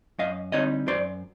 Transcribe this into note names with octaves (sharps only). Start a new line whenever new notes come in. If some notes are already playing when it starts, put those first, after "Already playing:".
F#2 D#5 F5
D3 G3 C4 D#4 C#5 D#5
F#2 C5 D5